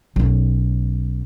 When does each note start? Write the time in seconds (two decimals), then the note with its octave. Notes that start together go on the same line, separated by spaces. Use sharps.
0.16 B1 C#4